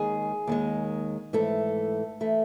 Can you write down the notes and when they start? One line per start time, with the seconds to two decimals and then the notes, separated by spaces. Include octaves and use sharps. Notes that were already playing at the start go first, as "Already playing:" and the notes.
Already playing: D#2 D#3 G#3 G#4
0.47 D#2 D#3 G#3
1.33 G#2 E3 A3 A4
2.21 E3 A3